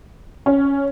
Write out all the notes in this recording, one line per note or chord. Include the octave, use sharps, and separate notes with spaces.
C#4